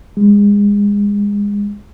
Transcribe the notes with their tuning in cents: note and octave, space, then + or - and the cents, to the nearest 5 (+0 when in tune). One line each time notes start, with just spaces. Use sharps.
G#3 -30